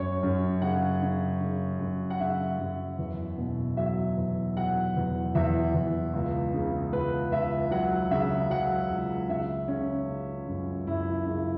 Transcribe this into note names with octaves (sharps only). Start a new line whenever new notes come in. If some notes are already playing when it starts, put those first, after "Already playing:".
Already playing: F#2 C#5
F#2
C#3 F#5
C#3
C#3
F#2
F#5
C#3 E5
F#2
E2
B2
F#3 E5
E2
F#3 F#5
E2
E2 E5
E2
C#2
C#3
C#2 B4
C#2 E5
F#3 F#5
C#3 E5
F#3 F#5
C#2
C#3 E5
C#3 C#4
C#3
F#2
F#2 E4
C#3